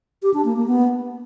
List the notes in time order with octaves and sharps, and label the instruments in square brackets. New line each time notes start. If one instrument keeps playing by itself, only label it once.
[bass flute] G4
D4
A#3
A#3
B3